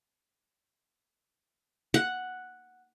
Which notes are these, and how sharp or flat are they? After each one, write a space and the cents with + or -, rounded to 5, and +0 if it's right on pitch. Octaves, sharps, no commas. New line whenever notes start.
F#5 +0